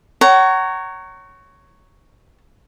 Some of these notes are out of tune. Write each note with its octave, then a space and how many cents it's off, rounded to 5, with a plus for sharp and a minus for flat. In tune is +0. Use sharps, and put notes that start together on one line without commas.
C#5 +0 F#5 +40 A#5 -15